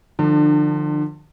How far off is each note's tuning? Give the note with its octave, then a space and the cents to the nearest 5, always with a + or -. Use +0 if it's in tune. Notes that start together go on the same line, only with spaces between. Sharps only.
D3 +35 F3 +0 D4 +25